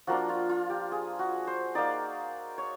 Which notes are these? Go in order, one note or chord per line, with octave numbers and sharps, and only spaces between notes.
F3 A#3 D4 F#4
F4
F4
G4
G#4
F#4
C5
A#3 D#4 D5
C#5